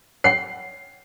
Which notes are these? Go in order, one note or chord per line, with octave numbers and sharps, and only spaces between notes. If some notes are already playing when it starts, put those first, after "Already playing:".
C#5 F#5 G5 C7